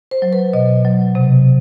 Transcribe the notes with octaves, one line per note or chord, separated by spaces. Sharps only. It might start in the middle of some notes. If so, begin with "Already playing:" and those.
C5
F#3
B4
B2 D#5
F#3
C3